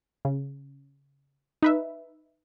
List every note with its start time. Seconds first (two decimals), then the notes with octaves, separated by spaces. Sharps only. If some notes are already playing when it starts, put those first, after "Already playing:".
0.25 C#3
1.63 D#4 B4 E5